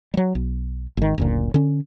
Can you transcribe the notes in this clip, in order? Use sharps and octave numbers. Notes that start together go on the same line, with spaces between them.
F#3 G3
B1
G#1 D#3
F#1 D2 A#2
D3 C#4